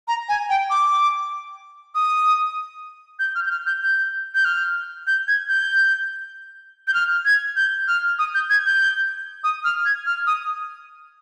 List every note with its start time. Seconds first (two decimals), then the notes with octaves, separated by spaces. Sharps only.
0.08 A#5
0.29 G#5
0.50 G5
0.70 D6
1.95 D#6
3.19 G6
3.35 F6
3.46 G6
3.51 F6
3.67 G6
3.82 G6
4.35 G6
4.45 F6
5.07 G6
5.28 G#6
5.49 G6
6.88 G6
6.94 F6
7.25 G#6
7.56 G6
7.88 F6
8.19 D#6
8.34 G6
8.50 G#6
8.66 G6
9.44 D#6
9.64 F6
9.85 G#6
10.06 F6
10.27 D#6